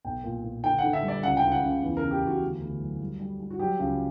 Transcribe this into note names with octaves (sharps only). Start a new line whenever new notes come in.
B1 G5
A#2
A#2
D3 G5
D3 F#5
E5
G3
D5
C#2 F#5
G5
C#2
F#5
C#3
E2
C#3 A#4
G4
E2 F#4
D2
D2
F#3
G3
G3
G3
F#4
F#3 G4
C#2